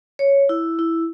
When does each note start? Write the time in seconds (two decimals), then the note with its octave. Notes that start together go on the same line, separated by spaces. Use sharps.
0.19 C#5
0.49 E4
0.79 E4